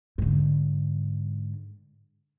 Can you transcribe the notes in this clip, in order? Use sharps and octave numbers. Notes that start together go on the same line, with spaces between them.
G#2 D3